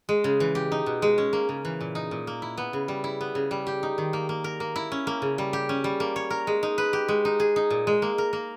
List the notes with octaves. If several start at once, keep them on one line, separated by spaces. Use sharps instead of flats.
G#3
C#3
E3
G4
D#4
B2
G#3
C#4
A#3
C#3
E3
A#2
D#4
A#2
A#3
E4
B3
C#3
G3
E4
B3
C#3
G3
G4
D#4
D#3
A#3
A#3
A#4
A#3
E4
C#4
A#3
C#3
G3
G4
C#4
G3
A#3
C#5
A#4
G#3
D#4
B4
G4
G#3
D#4
G#4
D#4
A#2
G#3
A#3
A#4
A#3